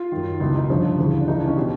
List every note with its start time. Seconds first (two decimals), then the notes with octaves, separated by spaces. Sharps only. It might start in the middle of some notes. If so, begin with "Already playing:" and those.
Already playing: F4
0.12 F#2 D#3
0.40 C#2 B2 E4
0.55 D#4
0.69 G2 D3 F3 C#4
0.99 D2 C#3 E3
1.20 D4
1.28 C#2 C#3 E3 D#4
1.37 D4
1.47 C#4
1.57 B2 G4